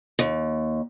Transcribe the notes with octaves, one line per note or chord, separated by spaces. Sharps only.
D#2